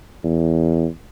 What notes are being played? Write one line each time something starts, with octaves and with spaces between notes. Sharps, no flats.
E2